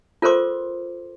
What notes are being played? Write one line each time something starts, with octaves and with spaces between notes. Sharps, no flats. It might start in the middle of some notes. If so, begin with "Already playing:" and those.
F4 A4 A#4 C5 C6 D6